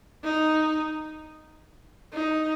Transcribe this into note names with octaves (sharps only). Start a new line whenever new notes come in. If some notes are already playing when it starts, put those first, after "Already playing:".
D#4
D#4